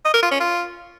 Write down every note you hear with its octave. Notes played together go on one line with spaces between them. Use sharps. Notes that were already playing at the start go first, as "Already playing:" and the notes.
D#5
A#4
F4
C#4
F4